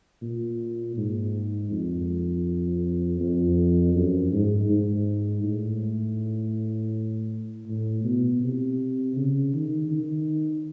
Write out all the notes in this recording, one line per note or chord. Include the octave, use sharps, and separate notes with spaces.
A#2
G#2
F2
F2
F#2
G#2
G#2
A2
A2
B2
C3
C#3
D#3
D#3